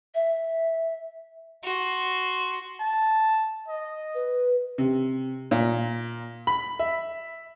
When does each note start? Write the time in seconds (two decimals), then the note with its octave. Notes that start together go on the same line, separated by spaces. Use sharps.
0.15 E5
1.64 F#4 C6
2.80 A5
3.67 D#5
4.15 B4
4.78 C3
5.51 A#2
6.47 B5
6.79 E5